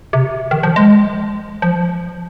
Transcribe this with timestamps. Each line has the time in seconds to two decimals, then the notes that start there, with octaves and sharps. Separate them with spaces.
0.13 C3
0.51 D#3
0.63 F3
0.76 G#3
1.62 F3